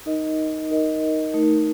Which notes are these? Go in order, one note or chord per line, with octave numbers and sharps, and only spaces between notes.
D#4 A#4 D#5
D#4 A#4 D#5
A3 D#4 A#4